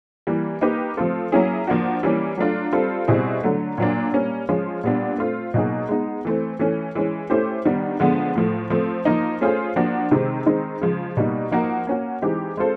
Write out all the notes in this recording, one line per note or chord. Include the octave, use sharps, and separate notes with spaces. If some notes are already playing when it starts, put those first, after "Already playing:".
E3 G3 A#3
A#3 D#4 G4 B4
F3 A3 C4 F4 A4
F#3 A#3 C#4 E4 G#4
F3 A#3 D4 F#4
E3 G3 A#3 C#4
F#3 A3 D4 F4
G3 C4 F4 A4
B2 G3 C4 E4 G#4
D3 F#3 A3
A#2 F#3 A#3 D4
G3 A#3 C#4
F3 G#3 C#4 F4
A#2 G3 B3 D4
A3 C4 F4
B2 F#3 A#3 D#4 G#4
G#3 B3 D#4
E3 A3 C4
E3 A3 C#4
E3 G#3 C#4
A3 C#4 E4 G4 C5
D#3 G3 B3 D4
D3 F3 G#3 B3
A2 F3 A3
F3 A3 C4
F3 A#3 D#4
A3 C#4 F4 G#4 C5
F3 A#3 D4 F#4
C3 D#3 G#3 C4
D#3 G#3 C4 D#4
C#3 F3 G#3
B2 G3 A#3 D#4
F3 A#3 D#4 F#4 A#4
A#3 C#4 F#4
E3 G#3 C4 D#4 G4
G#3 C4 F4 A4 C5